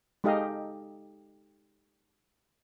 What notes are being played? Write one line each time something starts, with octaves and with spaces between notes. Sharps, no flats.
G#3 D#4 G4 A4 D#5 F5